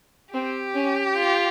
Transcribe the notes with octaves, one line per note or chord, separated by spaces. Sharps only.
C4 G4
C#4
F4